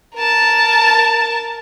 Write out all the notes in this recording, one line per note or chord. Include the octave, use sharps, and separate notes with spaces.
A#4 A5